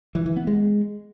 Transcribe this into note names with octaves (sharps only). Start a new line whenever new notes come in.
E3
E3
B3
G#3